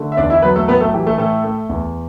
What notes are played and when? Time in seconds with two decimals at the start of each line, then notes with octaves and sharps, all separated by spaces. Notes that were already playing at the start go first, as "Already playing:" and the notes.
Already playing: D3 A3
0.12 E5
0.17 E2 D4 D5
0.30 E4 E5
0.42 F#3 B3 B4
0.56 A3 A4
0.68 A2 B3 B4
0.80 A3 A4
0.94 E3 G4
1.06 A3 A4
1.18 A2 A3 A4
1.45 A3
1.69 E2